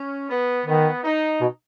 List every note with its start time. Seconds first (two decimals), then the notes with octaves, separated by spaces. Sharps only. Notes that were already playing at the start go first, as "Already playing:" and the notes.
Already playing: C#4
0.29 B3
0.66 D#3 B3
1.03 D#4
1.41 B2